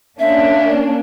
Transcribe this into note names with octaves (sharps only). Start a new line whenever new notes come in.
A#3 C#4 D4 E5